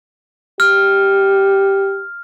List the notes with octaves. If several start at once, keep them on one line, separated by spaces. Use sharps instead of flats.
G4 F6